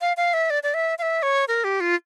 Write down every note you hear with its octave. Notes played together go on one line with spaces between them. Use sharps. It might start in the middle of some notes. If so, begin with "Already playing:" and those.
F5
F5
E5
D5
D5
E5
F5
E5
C#5
A#4
G4
F4